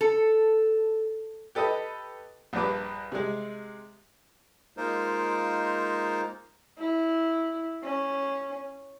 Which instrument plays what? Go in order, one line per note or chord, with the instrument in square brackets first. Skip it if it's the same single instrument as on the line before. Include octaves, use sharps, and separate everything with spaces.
[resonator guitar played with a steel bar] A4
[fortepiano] G4 A4 B4 D#5
A#1 G2 B4 D6
C3 G#3
[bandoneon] G#3 A#3 D#4 F4 A#4 C5
[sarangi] E4
C#4